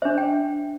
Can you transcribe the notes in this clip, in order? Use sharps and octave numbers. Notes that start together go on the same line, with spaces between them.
D4 C5 E5
G5